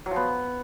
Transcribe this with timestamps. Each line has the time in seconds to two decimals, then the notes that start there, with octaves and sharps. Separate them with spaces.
0.06 F#3
0.11 F3
0.16 B3